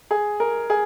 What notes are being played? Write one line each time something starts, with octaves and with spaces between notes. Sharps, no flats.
G#4
A#4
G#4